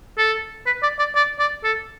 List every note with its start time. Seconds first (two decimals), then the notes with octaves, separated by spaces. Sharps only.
0.18 A4
0.66 B4
0.83 D5
0.99 D5
1.15 D5
1.39 D5
1.64 A4